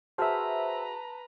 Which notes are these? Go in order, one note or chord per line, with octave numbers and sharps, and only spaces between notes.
F#4 G#4 B4 C5 E5 A5 A#5 F6